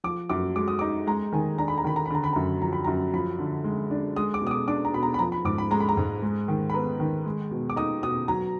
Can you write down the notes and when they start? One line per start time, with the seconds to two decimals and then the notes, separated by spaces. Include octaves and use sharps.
0.04 F3 D6
0.29 F#2 D6
0.56 G#3 D6
0.68 D#6
0.79 D#4 D6
1.07 G#3 A#5
1.32 D#3 G#5
1.58 D4 A#5
1.68 B5
1.78 A#5
1.84 D#3 B5
1.96 A#5
2.06 B5
2.10 D3 A#5
2.24 B5
2.33 F#2 A#5
2.62 F3 A#5
2.73 B5
2.84 F#2 A#5
3.13 F3 B5
3.39 D3
3.64 G#3
3.91 D4
4.16 G#3 D#6
4.34 D6
4.42 B2
4.47 D#6
4.51 D6
4.68 D4 D6
4.85 A#5
4.93 B2 B5
5.03 A#5
5.14 B5
5.19 F3 A#5
5.32 B5
5.45 G#2 D6
5.58 B5
5.71 G#3 A#5
5.80 B5
5.89 A#5
5.97 G#2
6.22 G#3
6.48 D#3
6.70 B5
6.74 B3 A#5
7.00 D#3
7.25 G#3
7.51 B2
7.70 D6
7.76 D#4 D#6
8.03 B2 D#6
8.28 F#3 A#5